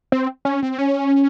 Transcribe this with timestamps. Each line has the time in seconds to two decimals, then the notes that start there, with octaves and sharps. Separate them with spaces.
0.12 C4
0.45 C#4
0.62 C4
0.78 C#4